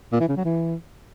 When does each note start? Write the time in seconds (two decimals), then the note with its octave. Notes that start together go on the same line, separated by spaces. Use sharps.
0.12 A#2
0.20 E3
0.28 C#3
0.37 F#3
0.45 E3